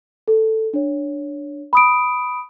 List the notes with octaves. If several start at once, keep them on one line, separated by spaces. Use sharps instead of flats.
A4
D4 C#5
B5 D#6 D7